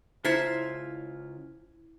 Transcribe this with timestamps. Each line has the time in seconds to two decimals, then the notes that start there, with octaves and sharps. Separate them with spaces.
0.25 C#3 E4 F4 C5 E5 A#5 G#6 B6